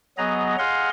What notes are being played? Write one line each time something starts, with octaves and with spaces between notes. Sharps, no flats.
F#3 B3 G#4 D#5 A#5
G#4 D#5 F5 F#5 C6